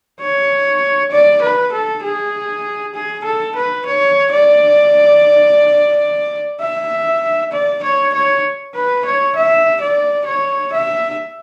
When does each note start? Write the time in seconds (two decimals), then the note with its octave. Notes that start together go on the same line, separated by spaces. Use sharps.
0.21 C#5
1.12 D5
1.43 B4
1.73 A4
2.04 G#4
2.95 G#4
3.25 A4
3.56 B4
3.86 C#5
4.32 D5
6.61 E5
7.52 D5
7.84 C#5
8.14 C#5
8.75 B4
9.05 C#5
9.36 E5
9.81 D5
10.27 C#5
10.73 E5